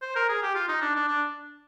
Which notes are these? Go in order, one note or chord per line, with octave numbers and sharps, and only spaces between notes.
C5
A#4
G#4
G4
F4
D#4
D4
D4
D4